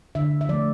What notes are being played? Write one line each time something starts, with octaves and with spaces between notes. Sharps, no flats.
D3 E5
E5
F3 A3 D5